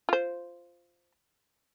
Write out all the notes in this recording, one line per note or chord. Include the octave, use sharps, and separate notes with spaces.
F4 C5